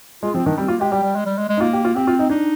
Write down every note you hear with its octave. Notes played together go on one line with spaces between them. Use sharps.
G#3 F4
F3 C4
D#3 D4
G3 C4
A#3 F4
G#3 G4
G3 G4
G3
G#3
G3
G#3
G#3
D#4
A#3 F4
G4
F4
C4 G4
F4
D#4
D4 D#4